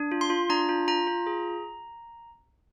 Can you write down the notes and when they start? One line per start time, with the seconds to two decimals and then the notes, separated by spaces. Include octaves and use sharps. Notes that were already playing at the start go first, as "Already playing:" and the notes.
Already playing: D4
0.12 F4
0.21 C6
0.30 F4
0.50 D4 A#5
0.69 F4
0.88 F4 A#5
1.07 F4
1.26 G#4